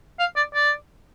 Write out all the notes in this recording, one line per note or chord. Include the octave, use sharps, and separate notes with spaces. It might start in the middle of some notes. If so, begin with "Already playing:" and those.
F5
D5
D5